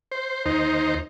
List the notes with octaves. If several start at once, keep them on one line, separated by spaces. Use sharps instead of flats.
C5
D#2 D#4 C5